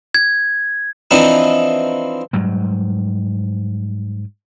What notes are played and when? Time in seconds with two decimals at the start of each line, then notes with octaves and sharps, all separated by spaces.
0.15 G#6
1.11 E3 F3 C4 D4 D#4
2.33 G#2 F#3 G3